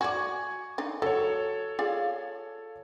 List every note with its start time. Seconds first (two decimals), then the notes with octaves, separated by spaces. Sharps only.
0.01 F#4 D5 G#5 C#6 G#6
0.78 D4 D#4
1.02 F#3 A4 C#5
1.79 F4 G#4 D5